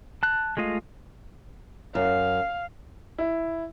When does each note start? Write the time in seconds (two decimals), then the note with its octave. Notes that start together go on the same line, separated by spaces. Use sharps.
0.23 A5 F#6
0.57 G#3 A3 F4 D#5 F5
1.95 F#2 F5
3.18 E4